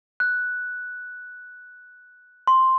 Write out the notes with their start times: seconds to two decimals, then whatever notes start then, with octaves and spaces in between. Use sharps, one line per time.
0.20 F#6
2.47 C6